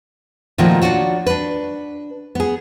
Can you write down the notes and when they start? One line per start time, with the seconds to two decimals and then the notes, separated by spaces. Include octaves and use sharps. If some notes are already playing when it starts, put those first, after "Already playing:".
0.58 A#2 D#3 F3 A3 A#3 F#4
0.81 D4 D#4 F4 F#4 C#5
1.26 D4 B4
2.35 B3 G#4